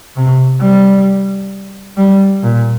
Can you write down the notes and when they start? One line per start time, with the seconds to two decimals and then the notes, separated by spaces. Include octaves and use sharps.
0.16 C3
0.61 G3
1.97 G3
2.43 A#2